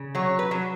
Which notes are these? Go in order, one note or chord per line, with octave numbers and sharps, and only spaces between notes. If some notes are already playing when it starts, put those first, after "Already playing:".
Already playing: C#3
F#3 C#5
B4
F#3